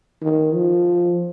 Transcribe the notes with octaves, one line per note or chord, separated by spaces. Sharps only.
D#3
F3